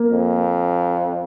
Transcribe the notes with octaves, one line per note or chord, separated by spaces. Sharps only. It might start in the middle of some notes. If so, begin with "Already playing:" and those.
Already playing: A#3
F2